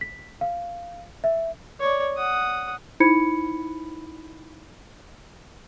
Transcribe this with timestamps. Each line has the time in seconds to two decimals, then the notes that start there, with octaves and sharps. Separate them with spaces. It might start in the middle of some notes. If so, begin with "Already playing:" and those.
0.01 B6
0.41 F5
1.24 E5
1.80 C#5 D5
2.17 F#5 D#6
3.00 D#4 E4 C5 B5 G#6 C#7